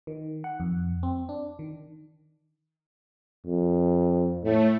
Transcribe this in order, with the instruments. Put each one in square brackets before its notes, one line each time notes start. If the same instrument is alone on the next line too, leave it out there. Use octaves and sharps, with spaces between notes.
[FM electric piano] D#3
F#5
F2
C4
D4
D#3
[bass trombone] F2
[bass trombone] A2 [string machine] A3